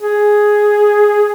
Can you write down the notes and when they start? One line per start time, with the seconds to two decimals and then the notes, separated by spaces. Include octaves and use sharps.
0.01 G#4